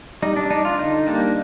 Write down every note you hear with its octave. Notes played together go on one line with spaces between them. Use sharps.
G3 D#4
D4
D4 D#4
F4
D3 D#4
G3 A#3 D4